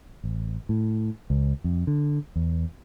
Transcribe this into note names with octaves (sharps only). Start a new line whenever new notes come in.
A1
A2
C#2
F2
D3
E2